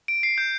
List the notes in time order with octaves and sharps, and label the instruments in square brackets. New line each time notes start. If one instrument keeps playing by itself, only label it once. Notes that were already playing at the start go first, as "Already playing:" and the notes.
[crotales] D7
C7
G6